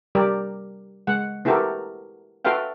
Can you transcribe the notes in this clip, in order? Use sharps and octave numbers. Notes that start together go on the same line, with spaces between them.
G3 G4 A#4 D5
G#3 F#5
B3 E4 F#4 G4 A4 A#4
F#4 A4 B4 E5 F5 G5